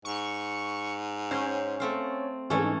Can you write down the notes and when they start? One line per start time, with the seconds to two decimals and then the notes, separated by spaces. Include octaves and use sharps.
0.05 G#2 C#6
1.31 C#4 C5 G5
1.80 A3 C4 F5
2.50 G#2 E3 A3 C#4